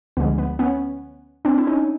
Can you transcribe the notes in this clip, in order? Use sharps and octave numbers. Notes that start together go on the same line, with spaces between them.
D2 D3 F3 G#3 B3
B3
B3 C#4
C4 D4
E4
C#4 D#4